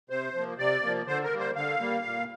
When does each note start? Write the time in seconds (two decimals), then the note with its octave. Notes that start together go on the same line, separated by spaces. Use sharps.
0.10 C3 C5
0.34 F3 A#3
0.58 C3 D5
0.83 F3 A#3
1.07 D3 C5
1.23 A#4
1.32 G3 A#3
1.39 C5
1.56 D3 F5
1.80 G3 A#3
2.05 A#2